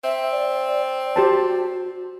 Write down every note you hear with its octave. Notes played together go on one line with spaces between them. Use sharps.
C4 E5
D5
F#4 G4 C5 A5